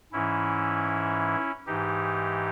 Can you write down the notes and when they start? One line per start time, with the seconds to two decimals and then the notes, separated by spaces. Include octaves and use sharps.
0.13 G#2 E3 C#4 E4
1.67 G#2 E3 D#4 G4